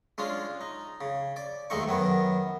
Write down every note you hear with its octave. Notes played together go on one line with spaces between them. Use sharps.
G#3 C#4 D4 F4
D#4
C#3
D5
D#2 G#3 A3 D#4 C#6
F#2 D#3 B3